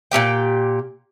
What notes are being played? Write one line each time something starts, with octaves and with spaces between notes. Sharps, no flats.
A#2 D#4 G4 G5